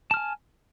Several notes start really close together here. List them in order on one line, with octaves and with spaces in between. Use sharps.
A5 F6 G#5